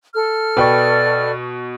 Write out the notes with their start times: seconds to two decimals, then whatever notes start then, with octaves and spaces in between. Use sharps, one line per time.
0.14 A4 F6
0.57 B2 B4 D5 G5 C#6